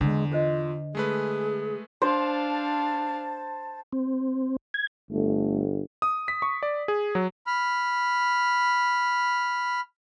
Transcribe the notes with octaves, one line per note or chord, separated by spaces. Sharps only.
E2 D3 G#3
F4 A4 C5 D#5
G#3 A3 G#4 B4
D4 C5 F5 A5
C4
G#6
G1 A3
D#6
B6
C#6
D5
G#4
F#3
B5 F6